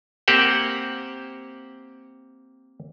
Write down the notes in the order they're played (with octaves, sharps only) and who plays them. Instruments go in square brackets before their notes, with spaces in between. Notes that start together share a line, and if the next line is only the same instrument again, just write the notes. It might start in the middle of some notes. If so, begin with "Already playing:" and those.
[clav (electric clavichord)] A#3 C4 G4 C5 F#5